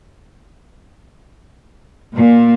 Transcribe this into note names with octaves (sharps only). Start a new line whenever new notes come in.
A#2